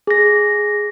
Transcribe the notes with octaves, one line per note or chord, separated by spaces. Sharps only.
G#4 A#6